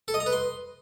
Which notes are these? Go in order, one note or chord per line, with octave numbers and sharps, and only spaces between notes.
A4
D#5
A#5
B4
C6